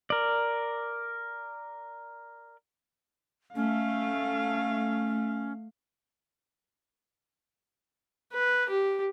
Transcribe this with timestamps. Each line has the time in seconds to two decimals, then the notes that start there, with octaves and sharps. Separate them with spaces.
0.10 A#4 D5
3.55 A3 C#4 F5
8.33 B4
8.69 G4